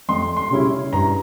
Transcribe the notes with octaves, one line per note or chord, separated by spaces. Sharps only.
F2 C6
C6
C#3 G3 C#4 E4
G2 A#5